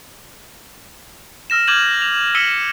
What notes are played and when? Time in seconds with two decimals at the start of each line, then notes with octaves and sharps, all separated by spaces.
1.50 E6 F6 A#6 E7
1.68 D6 F6 G6 G#6 D#7 F#7
2.02 F7
2.35 E6 B6 C#7 D#7 F#7 G7